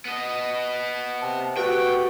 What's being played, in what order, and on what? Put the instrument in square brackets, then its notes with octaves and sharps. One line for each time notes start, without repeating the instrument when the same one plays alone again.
[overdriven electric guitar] B3 D#5
[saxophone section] C3 [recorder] A5
[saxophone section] A3 F#4 [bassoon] G4 [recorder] B4 [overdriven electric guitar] G5